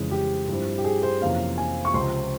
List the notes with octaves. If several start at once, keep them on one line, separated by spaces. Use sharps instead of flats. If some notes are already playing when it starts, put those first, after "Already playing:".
Already playing: F2 C#3 E3 G#3
G4
G2 F3 C4 E4
G4
G#4
C5
F2 C3 E3 A#3 C#4 F5
G#5
C#6
C#2 C3 F3 C4 C6